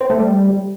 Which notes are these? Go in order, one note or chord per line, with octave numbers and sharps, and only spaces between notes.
C4
A3
G3